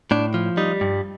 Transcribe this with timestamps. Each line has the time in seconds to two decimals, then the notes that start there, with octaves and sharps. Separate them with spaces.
0.11 A2 D4
0.34 F3
0.57 G3 D#4
0.81 G2